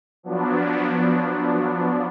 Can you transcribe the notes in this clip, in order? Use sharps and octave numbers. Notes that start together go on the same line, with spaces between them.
F3 F#3 B3 D4